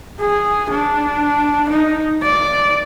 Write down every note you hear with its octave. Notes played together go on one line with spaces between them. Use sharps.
G#4
D4
D#4
D5